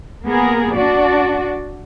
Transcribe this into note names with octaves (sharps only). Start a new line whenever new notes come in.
A#3 B3 G#4 A#4
D4 F#4 D5